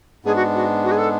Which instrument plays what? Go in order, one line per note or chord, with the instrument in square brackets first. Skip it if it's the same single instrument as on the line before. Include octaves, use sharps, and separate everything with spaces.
[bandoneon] G#2 G#3 B3 D4 [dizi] G#4
[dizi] F#4
F#4
F#4
G#4
A4